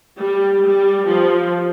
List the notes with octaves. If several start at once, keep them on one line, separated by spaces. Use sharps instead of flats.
G3
G3
F3